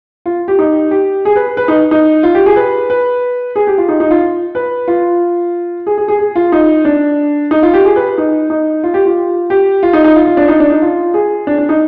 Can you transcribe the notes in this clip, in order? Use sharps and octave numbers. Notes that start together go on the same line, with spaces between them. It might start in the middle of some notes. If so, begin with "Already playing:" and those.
F4
G4
D#4
G4
G#4
B4
B4
D#4
D#4
F4
G4
G#4
B4
B4
G#4
G4
F4
D#4
D#4
F4
B4
F4
G#4
G#4
G#4
G#4
F4
D#4
D4
D#4
F4
G4
G#4
B4
D#4
D#4
F4
G4
F4
G4
F4
D#4
D#4
F4
F4
D4
D#4
D4
D#4
F4
G#4
D4
D4
D#4